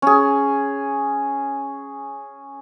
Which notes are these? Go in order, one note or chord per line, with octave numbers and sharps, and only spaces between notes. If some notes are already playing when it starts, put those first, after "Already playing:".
C#4 G#4